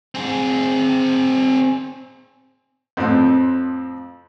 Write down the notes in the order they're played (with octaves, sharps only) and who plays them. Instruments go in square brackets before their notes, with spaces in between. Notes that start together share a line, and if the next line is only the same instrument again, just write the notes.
[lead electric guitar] C4 G#4
[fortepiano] F2 A2 C4